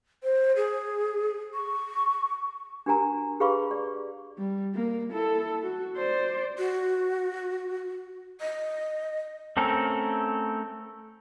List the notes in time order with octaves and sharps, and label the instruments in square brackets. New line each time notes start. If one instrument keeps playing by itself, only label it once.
[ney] C5
G#4
C#6
[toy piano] D4 F#4 G4 A#4 G#5 A#5
G4 G#4 B4 F5 B5 C#6
D5
[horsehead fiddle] G3
A#3
E4 A4
F#4
C5 D5
[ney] F#4
D#5
[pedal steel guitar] A3 C4 C#4 A4 A#4